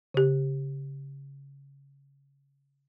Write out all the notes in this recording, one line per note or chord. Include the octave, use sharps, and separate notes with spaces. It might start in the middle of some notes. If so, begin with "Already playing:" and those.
C#3 G4